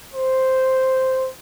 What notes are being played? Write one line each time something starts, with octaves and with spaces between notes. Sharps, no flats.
C5